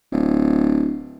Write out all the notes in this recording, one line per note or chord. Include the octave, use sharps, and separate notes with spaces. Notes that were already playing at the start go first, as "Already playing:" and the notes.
D1